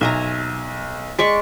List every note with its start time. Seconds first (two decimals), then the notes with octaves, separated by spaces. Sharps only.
0.01 B1 E5 G#5 A#5
1.19 G#3 D5 C#6 B6